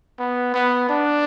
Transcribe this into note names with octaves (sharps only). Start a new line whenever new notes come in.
B3
B3
D4